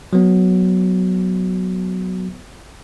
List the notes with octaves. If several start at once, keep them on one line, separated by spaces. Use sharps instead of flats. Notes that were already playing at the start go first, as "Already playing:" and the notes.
F#3 B3